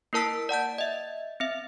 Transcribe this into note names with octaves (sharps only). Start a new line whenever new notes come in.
A#3 E4 A#4 A5 E6 B6
D5 F#5 A5 G6
D#5 E5
C4 E5